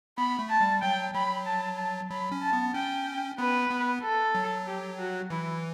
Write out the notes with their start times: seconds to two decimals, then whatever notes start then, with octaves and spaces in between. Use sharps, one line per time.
0.18 B3 B5
0.39 A3
0.50 A5
0.61 G3
0.82 F#3 G5
1.14 F#3 B5
1.46 A5
1.78 A5
2.10 F#3 B5
2.32 C#4
2.42 A5
2.53 B3
2.74 C#4 G5
3.38 B3 B4
3.70 B3
4.02 A4
4.35 F#3
4.67 G4
4.99 F#4
5.30 E3 E4